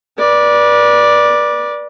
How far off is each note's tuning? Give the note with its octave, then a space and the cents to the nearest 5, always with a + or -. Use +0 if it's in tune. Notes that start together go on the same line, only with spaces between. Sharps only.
B4 -35 D5 +0